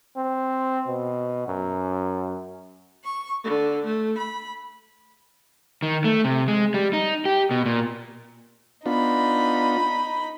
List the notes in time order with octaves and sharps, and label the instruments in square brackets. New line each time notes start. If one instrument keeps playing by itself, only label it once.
[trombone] C4
B2
F#2
[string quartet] C#6
D3
A3
B5
[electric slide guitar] D#3
A3
C3
G#3
G3
D#4
G4
B2
A#2
[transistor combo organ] B3 D4 F4 [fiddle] D#4 B5